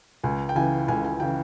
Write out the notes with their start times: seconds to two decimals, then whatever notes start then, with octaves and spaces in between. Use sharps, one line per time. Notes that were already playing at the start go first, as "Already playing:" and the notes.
0.24 C#2 G#5
0.49 G5
0.55 C#3 E3 G#5
0.88 C#2 G#5
1.05 G#5
1.20 C#3 E3 G5